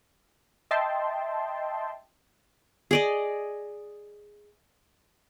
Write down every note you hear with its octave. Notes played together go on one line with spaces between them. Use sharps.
D#5 E5 G5 A5 C6
G#4 D5 D#5